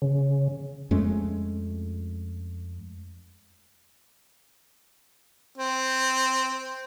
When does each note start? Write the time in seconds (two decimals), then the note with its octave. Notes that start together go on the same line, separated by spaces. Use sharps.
0.02 C#3
0.91 F2 G#3 A3 C#4
5.58 C4